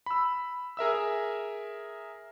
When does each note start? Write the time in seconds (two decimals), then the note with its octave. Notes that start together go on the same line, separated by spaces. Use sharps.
0.06 B5 E6
0.77 G#4 A#4 E5 E6